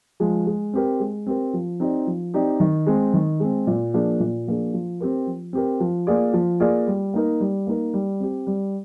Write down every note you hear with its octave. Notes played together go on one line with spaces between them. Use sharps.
F3 G#3
G#3
C4 G4 A#4
G#3
C4 G4 A#4
F3
C4 D#4 G4 D5
F3
C4 D#4 G4 D5
D#3
G#3 C4
D#3
G#3 C4
A#2
F3 A#3 D4 G#4
A#2
F3 A#3 D4 G#4
F3
C4 G4 A#4
F3
C4 G4 A#4
F3
A#3 F4 G#4 D5
F3
A#3 F4 G#4 D5
G3
A#3 D#4 A#4
G3
A#3 D#4 A#4
G3
C4 G4
G3